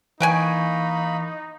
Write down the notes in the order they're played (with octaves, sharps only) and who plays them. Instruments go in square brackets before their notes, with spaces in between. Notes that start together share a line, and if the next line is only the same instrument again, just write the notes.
[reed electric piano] E3 C#6 [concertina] A#3 B5 [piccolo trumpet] D#4 [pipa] B4 G5 G#5